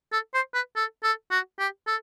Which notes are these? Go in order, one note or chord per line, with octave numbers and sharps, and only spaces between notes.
A4
C5
B4
A4
A4
F#4
G4
A4